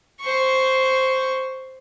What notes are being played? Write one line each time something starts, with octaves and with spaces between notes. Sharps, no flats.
C5 C#6